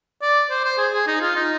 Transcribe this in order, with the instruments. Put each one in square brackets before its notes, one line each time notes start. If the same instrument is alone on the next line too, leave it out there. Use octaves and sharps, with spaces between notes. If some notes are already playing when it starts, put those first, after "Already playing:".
[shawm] D5
C5
C5
G#4
G#4
D#4
F4
D#4